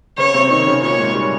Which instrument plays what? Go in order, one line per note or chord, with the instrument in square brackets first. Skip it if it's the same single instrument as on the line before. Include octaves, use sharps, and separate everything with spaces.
[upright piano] C#3 C#4 [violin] C#5
[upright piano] C3 C4
[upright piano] D#3 D#4 [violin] C#5
[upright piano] C#3 C#4
[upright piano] A#2 A#3 [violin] C#5
[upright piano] G#2 G#3
G3